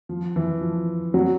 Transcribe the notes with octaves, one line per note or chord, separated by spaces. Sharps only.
F3
E3
F3
F#3